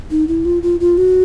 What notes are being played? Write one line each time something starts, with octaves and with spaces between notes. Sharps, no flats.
D#4
E4
F4
F4
F4
F#4